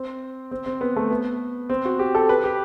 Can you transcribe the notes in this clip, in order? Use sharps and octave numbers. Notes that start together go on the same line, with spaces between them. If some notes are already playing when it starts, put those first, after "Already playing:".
Already playing: C4
C4
C4
B3
A3
B3
C4
F#4
G4
A4
B4
G4